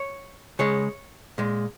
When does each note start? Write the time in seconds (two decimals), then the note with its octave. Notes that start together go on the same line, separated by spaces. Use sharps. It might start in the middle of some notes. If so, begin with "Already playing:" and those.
Already playing: C#5
0.59 C#3 G#3 C#5
1.38 A#2 G#3